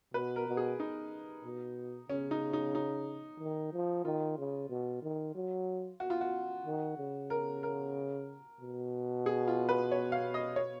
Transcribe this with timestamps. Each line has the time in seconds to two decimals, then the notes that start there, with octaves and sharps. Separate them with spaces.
0.14 B2 B4
0.36 A#4
0.47 B2
0.57 G#4
0.80 D#4
1.44 B2
2.09 C#3 C#4
2.31 D#4
2.53 D#4
2.75 D#4
3.40 D#3
3.73 F3
4.05 D#3 F4
4.38 C#3
4.69 B2
5.02 D#3
5.35 F#3
6.00 F#4
6.10 F4
6.21 F#4
6.66 D#3
6.97 C#3
7.30 A#4
7.63 A#4
8.61 B2
9.26 G#4
9.48 F4
9.69 B4
9.92 C#5
10.12 F5
10.34 D#5
10.56 C#5